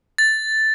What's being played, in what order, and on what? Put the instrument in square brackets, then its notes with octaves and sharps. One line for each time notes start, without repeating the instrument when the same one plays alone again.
[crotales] A6